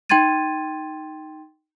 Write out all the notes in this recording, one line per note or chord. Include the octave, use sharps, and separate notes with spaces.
D#4 G5 C6 G#6 A6 D#7